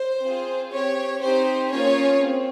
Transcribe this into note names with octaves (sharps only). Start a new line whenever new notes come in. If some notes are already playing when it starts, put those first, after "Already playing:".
Already playing: C5
C4 F4 G#4
C4 G4 C#5
C4 D#4 G4 C5
A#3 C#4 F4 G#4 C#5
C4